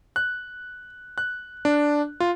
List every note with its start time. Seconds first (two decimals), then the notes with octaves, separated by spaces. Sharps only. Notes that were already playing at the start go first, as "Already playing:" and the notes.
0.16 F#6
1.18 F#6
1.65 D4
2.20 F4